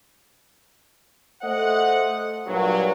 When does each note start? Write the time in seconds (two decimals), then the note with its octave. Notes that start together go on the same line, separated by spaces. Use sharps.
1.43 A3 C5 D#5 F#5
2.47 G2 A#2 F#3